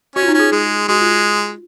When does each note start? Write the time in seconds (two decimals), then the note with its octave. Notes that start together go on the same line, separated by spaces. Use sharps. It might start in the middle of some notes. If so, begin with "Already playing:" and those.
0.16 C#4 F#4
0.23 F4
0.28 D#4
0.34 C#4
0.39 G#4
0.52 G#3 G#4
0.88 G#3 F#4
1.00 F4